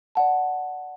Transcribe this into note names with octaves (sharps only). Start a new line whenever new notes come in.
D5 F#5 A5